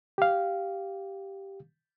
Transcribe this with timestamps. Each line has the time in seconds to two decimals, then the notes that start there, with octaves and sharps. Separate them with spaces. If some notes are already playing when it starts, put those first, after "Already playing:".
0.18 G4 F5